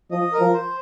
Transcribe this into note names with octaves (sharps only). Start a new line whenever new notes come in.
F3 D#5
A#4
F3
C5